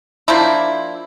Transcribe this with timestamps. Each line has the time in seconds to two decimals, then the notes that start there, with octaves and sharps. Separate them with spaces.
0.28 F3 A#3 D4 E4